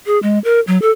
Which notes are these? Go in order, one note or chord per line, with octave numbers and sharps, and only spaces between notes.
G#4
G#3
A#4
F#3
A4